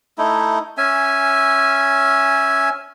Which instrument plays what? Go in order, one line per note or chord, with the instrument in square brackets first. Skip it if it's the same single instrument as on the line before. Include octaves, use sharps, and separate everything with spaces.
[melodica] A3 D#4 E4
C#4 E5 G#5